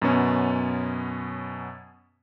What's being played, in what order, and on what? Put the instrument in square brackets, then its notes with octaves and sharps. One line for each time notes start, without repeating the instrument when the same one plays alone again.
[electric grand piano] F#2 B2 B3 C#4